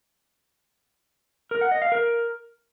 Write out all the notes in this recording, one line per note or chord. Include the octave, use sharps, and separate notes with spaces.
A#4
F#5
D#5
F5
A#4